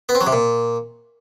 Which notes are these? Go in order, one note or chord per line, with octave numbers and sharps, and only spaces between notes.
B3
C4
F#3
C3
A#2